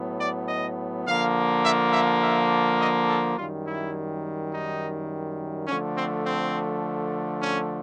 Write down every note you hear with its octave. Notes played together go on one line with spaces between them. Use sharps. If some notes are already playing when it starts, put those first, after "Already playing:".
Already playing: A2 F#3 B3
D5
D#5
D3 F3 A#3 F5
E5
E5
E5
D#5
A4
F#2 D#3 G3 F4
E4
D#4
D3 F3 A3 C#4
C4
C4
C#4